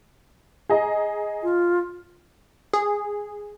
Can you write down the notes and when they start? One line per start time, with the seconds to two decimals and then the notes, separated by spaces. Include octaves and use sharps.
0.69 G#4 D#5 A#5
1.43 F4
2.73 G#4